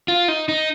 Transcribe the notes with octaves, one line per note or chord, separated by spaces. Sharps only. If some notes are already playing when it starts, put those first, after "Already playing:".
F4
D#4
D#4